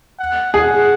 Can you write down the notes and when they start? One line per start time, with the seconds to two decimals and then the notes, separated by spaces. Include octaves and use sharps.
0.19 F#5
0.53 G#4 F#5